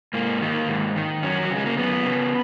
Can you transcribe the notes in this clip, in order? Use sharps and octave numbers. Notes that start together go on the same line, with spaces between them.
G#2 A#3
D#3
G#2
D#3
F#2 C#4
F#3
C#3
G#3
A#3
F#2 B3
C#3